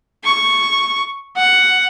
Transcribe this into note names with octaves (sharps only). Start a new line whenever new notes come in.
C#6
F#5